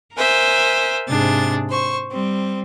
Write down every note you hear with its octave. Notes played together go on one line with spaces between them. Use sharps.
A#4 C5 E5 G#5
G#2 C3 D4 G#4 A6
C5 C#6
G3 C4